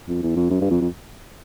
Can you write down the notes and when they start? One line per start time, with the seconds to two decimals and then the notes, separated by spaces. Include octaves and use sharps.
0.08 F2
0.22 E2
0.36 F2
0.50 F#2
0.61 G2
0.71 F2
0.81 F2